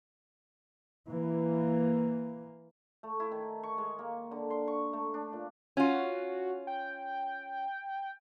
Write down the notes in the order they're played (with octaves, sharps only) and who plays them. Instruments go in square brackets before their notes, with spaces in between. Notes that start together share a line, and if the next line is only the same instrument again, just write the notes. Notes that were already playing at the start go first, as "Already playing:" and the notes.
[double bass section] E3 A#3
[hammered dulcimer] A3
E4
D#3
C#6
G#3
A#3
D3
C6
C#6
A3
D4
A#2
[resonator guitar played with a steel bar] C#4 F4 [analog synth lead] F#4
[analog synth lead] G5